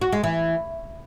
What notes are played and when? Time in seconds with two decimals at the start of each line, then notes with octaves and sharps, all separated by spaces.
0.01 F#4
0.13 G#3
0.24 E3